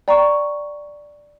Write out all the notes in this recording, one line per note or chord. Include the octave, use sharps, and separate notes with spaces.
D5 G5 A#5 C#6